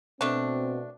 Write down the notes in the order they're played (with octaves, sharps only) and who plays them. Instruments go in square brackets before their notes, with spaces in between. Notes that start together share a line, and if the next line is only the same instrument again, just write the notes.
[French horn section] B2 C4 [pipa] A3 D4